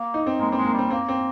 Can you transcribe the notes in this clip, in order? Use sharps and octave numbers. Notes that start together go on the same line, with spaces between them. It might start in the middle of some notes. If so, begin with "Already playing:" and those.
Already playing: A#3
D#4
C4
G#3 A#3
G3 C4
G#3
A#3
G3
C4
A#3 C4
C4